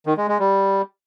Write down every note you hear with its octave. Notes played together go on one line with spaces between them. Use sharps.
D#3
G#3
G#3
G3